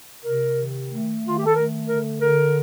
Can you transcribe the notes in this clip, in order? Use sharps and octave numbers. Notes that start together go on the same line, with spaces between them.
C3 A#4
D#3
A3
D#3
F4
G4
A4
A3 A#4
D3 A#4
D3 A#4